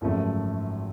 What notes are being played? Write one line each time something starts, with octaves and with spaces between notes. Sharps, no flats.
G#1 F#2 C#3 F3 A3